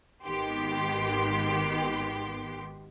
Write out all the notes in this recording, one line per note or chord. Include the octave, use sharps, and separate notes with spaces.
G#1 D#3 B3 G4 C6